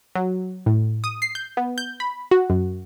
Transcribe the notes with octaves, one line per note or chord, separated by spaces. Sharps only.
F#3
A2
D#6
C7
G6
B3
G6
B5
F#4
F#2